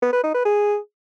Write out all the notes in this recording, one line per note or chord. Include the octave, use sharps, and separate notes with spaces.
B3
B4
D#4
B4
G#4